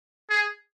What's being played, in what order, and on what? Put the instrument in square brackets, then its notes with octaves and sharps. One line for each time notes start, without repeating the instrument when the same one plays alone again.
[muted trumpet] G#4